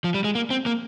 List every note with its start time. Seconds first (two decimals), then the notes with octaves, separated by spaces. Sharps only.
0.04 F3
0.14 G3
0.24 G#3
0.35 A#3
0.50 C4
0.66 A#3